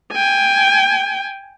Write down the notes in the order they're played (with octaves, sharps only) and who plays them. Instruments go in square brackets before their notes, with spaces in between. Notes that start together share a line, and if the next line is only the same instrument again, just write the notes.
[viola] G5 G#5